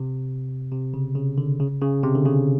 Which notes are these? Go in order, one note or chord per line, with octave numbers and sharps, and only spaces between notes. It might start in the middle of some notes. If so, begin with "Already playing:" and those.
Already playing: C3
C3
C#3
C#3
D3
C#3
C#3
C3
D3
C#3